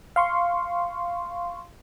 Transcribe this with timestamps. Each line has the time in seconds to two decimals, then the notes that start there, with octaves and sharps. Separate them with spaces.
0.16 F5 C6 C#6